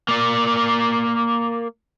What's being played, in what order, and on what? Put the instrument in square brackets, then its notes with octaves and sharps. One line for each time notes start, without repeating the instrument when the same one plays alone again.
[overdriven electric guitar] A#3 D5